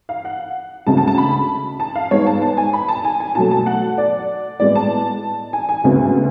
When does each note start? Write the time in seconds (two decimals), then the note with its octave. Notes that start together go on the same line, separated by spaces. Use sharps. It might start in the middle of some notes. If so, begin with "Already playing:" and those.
0.09 F5
0.25 F#5
0.87 D2 C#3 G#3 A5
0.97 A5
1.08 A5
1.18 B5
1.80 A5
1.95 F5
2.11 G#2 G#3 B3 C#5
2.27 A5
2.42 A5
2.57 G#5
2.73 B5
2.89 A5
3.05 G#5
3.20 G#5
3.35 B2 F#3 A3 A5
3.51 A5
3.66 F#5
3.98 D5
4.60 A2 G#3 B3 D5
4.75 A5
5.53 G#5
5.69 G#5
5.84 D2 C#3 G#3 B3